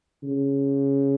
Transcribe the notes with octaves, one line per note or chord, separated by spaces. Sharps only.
C#3